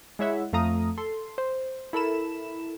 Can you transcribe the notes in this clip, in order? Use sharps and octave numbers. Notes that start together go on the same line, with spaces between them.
G#3 E4 C#5 E5 F#5
F2 A3 F5 A#5 D#6
A4 C6
C5
E4 A4 A#4 B5 E7